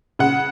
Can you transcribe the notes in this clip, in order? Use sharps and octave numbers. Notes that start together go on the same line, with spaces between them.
C#3 F#5